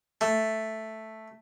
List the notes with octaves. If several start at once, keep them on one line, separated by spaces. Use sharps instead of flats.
A3